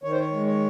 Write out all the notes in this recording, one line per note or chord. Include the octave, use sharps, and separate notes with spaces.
D#3 C#5
C5
C#5
G#3
C#5